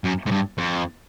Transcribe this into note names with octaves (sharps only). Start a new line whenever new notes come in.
F#2
G#2
G2
F2